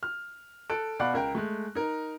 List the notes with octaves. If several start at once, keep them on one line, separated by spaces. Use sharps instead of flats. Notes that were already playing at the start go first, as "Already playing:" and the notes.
F6
A4 F#6 D7
B2 D5 F5 F#5 B5 F#6
C#2 A#4 G5
G#3 A3
D#4 A#4